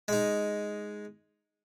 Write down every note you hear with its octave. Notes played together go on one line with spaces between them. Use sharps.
G#3 D#4